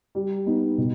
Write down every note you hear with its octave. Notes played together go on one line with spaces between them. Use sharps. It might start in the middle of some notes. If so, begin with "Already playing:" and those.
G3
B3 D#4
B2